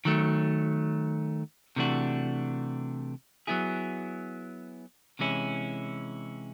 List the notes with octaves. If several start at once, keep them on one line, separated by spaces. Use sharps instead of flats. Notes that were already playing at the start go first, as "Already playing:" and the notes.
D#3 F#3 A3
C3 E3 A3 D4 F#4
F#3 B3 E4 G#4
C3 E3 G#3 C#4 E4